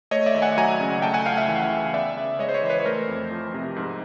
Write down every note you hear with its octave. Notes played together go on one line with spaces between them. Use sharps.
A3 C#5 D#5
D5 E5
D#2
F#5 G#5
F#3 G#5 A#5
C#3
A3 G5 A5
F#5 G#5
C#2 F5 G5
E5 F#5
E3
C#3
B3 D5 E5
C#3
G#3 C#5 D#5
C5
B4 C#5
E3
B4 C#5
C#5
A3 A#4 C5
F2
F3
C3
G#2